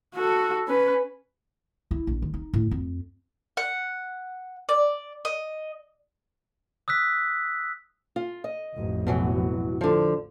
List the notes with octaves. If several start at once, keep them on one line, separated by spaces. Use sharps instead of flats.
F#4 A4
C#4 B4
E4
A#1
D#3
D#4
A2
F2
F#5
D5
D#5
D#6 E6 F#6 B6
F4
D#5
A1 F2
B2 E3 F#3
D3 F3